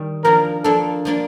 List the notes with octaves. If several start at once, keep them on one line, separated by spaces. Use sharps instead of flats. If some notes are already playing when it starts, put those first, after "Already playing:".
Already playing: D#3 G3
F3 A#3 D4 A#4
F3 A#3 D4 A4
F3 A#3 D4